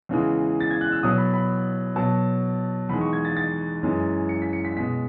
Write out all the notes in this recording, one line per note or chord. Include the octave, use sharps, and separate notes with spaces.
E2 C#3 E3 G#3
A6
G#6
F#6
E6
B2 F#3 D#6
B5
B5
B2 F#3 A5
E2 D#3 G#3 B5
C#6
G#6
A6
A6
F#2 E3 G#3
C#7
B6
C#7
B6
B2 G#3 B6